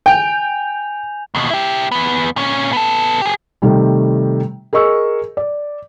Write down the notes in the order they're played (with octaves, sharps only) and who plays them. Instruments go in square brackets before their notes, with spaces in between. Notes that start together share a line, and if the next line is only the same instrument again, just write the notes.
[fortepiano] G5 [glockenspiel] G#5 G6 F7
[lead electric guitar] D#2 B2
E4 G4
E2 B3
A#2 C#4
B3 A4
G4 G#4
[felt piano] C3 D#3 G3 A3
G#4 A#4 D#5 C#6 E6
D5